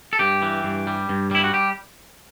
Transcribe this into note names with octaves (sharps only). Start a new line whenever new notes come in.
A4
G2 G4
E3
G2
G3
G2
G3 E4
F#4
G4